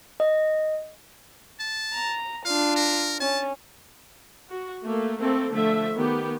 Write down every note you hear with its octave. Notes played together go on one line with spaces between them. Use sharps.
D#5
A5
A#5
D4 F4 F5
A#4
C#4 A5
F#4
A3 A#3
A3 A#3 C4 A4
D3 F3 A3 E5
D#3 B3 G4